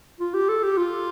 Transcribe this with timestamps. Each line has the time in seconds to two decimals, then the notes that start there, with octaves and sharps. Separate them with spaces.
0.20 F4
0.34 G4
0.49 A4
0.63 G4
0.78 F4